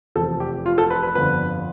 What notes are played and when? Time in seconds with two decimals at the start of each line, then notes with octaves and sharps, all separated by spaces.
0.15 F1 E2 C3 F3 A4
0.40 G4
0.66 F4
0.78 A4
0.90 B4
1.03 B4
1.15 G1 F2 D3 B4